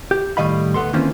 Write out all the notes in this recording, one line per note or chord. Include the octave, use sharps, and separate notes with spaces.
G4
A2 D#3 G3 D#5 F5 B5
D2 B3 A4 C6
D#3 E3 A#3 C4 C#4 F4